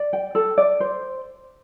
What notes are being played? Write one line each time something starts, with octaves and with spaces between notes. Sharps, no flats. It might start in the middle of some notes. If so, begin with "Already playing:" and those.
Already playing: D5
G5
A4
D5
C5